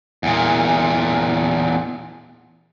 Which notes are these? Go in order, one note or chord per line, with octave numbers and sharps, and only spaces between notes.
E2 A#2